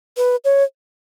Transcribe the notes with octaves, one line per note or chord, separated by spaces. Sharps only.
B4
C#5